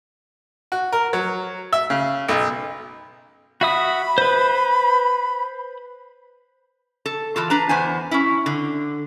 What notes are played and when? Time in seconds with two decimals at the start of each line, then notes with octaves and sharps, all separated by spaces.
0.72 F#4
0.92 A#4
1.13 F#3
1.73 E5
1.90 C#3
2.28 B1
3.61 F#4 E5 B5 D#6
4.18 B4 C5
7.06 A4
7.36 E3 F4 A4
7.50 D4 B4 A#5
7.69 E2 B3 C5 G#5
8.11 C#4 E4
8.46 D3